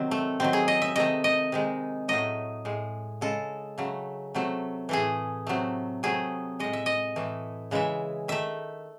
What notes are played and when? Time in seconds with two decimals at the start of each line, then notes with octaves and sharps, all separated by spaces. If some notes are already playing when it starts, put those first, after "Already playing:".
Already playing: C3 D#3 F#3 C4
0.11 A3
0.40 C3 D#3 F#3 C4
0.53 G#4
0.68 D#5
0.82 E5
0.96 C3 D#3 A3 D#5
1.24 D#5
1.52 C3 D#3 G#3
2.08 A2 F#3 A3 D#5
2.65 A2 G#3
3.21 C#3 G#3 A4
3.78 C#3 F#3 A3
4.35 C3 F#3 A3
4.89 A2 E3 A3 G#4
5.47 C3 F#3 A3
6.03 C3 F#3 A3 G#4
6.59 A2 G#3 D#5
6.73 E5
6.86 D#5
7.16 A2 E3 A3
7.71 C#3 E3 G#3 E5
8.28 D#3 A3 E5